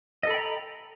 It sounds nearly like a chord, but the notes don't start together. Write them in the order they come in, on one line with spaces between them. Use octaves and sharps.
D#5 A4 B5 G5 A#5